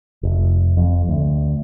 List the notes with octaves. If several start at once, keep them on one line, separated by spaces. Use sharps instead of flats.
F1
F2
D2